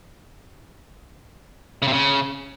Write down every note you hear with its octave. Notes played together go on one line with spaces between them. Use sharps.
C#3
C3
C#3